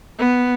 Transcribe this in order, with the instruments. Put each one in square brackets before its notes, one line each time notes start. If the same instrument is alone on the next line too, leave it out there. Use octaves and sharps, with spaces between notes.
[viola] B3